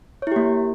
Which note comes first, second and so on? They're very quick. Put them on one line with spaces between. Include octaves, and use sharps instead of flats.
C#5 E4 G4 A#3